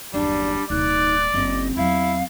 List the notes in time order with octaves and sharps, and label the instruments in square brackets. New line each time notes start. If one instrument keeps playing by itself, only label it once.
[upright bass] F#1 D#2 [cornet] G3 [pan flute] D4 [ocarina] D5
[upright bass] D1 B2 [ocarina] D#4 [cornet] D5 [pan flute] F#6
[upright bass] F#1 [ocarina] C4 [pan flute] D#5
[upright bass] E2 F#3 [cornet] E4 [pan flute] F5